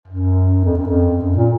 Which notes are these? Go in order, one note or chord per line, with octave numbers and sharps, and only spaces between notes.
F#2
F2
F#2
F2
F#2
A#2